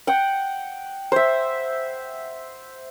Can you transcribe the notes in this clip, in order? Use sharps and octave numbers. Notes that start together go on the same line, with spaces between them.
F#5 G5
C5 E5